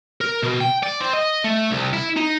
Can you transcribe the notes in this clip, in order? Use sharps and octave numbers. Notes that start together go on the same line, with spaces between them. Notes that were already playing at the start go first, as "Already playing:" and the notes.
A#4
B2
G5
D5
C4
D#5
A3
C2
E4
D#4